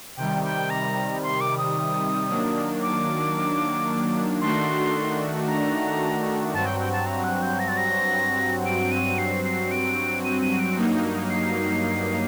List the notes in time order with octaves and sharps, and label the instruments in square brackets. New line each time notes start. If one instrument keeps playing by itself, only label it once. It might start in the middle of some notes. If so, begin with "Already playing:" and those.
[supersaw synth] C3 D#3 G3 [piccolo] G5
[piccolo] G5
A#5
C6
D6
D#6
[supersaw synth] D#3 F#3 A#3 D4
[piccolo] D6
[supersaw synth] D#3 A3 D4 F#4 [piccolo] C6
[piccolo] A#5
[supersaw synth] G2 F#3 C4 F#4 [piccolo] A5
[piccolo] G5
G5
A5
A#5
F#6
G6
A#6
A6
A#6
[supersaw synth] G2 F#3 C4 F#4 [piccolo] D7
[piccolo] D#7
C7
C7
D7
D#7
D#7
D7
[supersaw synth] G2 F#3 A#3 D#4
[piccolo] C7